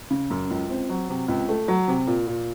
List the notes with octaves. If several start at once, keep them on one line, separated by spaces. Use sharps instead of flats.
C#3
F#2
C#2
C4
F#3
C3
C#2
A3
F#3
C3
A#2
A#2